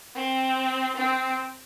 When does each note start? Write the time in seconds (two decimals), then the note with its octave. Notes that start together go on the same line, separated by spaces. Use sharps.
0.15 C4
0.96 C4